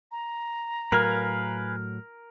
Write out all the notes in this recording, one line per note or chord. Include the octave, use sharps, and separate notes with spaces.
A#5
A2 F#3 A#4 B4 F5 G#5